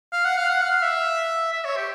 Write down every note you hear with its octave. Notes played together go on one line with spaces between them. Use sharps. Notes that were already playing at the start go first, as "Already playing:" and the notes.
F5
F#5
F5
F#5
F5
E5
E5
C#5
G4